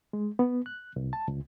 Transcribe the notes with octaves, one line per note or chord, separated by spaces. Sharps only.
G#3
B3
F#6
C2
A5
C#2